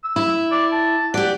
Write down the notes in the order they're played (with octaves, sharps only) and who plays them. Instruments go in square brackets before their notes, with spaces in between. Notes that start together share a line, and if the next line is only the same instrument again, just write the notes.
[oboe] E6
[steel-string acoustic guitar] E4
[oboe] D5
A5
[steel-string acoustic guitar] G4 D5 [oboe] F#5